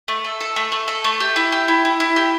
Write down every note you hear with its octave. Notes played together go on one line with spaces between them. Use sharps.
A3
A4
A4
A3
A3
A4
A3
G4
E4
G4
E4
E4
E4
G4